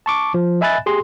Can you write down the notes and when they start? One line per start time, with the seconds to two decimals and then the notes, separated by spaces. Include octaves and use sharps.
0.06 A5 C#6 D6
0.34 F3
0.61 D#5 E5 G#5 B5 F#6 A6
0.86 G4 G#4 C6